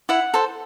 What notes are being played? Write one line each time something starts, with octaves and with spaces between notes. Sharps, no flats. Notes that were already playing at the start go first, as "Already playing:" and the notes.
E4 F#5
A4 C5